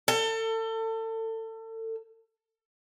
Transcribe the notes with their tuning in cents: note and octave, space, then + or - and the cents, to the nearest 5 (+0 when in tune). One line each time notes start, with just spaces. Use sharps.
A4 +30